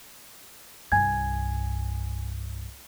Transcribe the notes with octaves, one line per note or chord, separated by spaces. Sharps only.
C2 G2 G#5 G#6